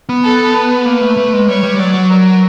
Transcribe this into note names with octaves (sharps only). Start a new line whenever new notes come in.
B3
A4
B4
A#3
A3
A3
G#3
G3 C#5
G3
F#3 D5
F#3
A#4